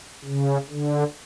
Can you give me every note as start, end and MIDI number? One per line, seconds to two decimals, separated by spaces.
0.25 0.58 49
0.70 1.04 50